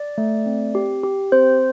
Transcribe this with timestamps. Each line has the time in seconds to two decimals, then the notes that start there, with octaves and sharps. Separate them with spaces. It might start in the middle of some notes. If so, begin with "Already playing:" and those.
Already playing: D5
0.18 A3
0.46 C4
0.75 G4
1.04 G4
1.32 C4 C5